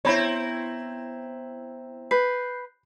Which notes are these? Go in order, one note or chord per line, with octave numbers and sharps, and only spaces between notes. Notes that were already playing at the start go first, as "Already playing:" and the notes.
B3 C4 E4 C#5 A#5 B5 G6
B4 F#6 G6 C7